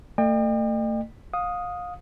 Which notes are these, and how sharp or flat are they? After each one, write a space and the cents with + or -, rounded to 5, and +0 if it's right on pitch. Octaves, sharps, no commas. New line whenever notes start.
A3 +35 D#5 -45 G5 +30
F5 +30 D#6 +0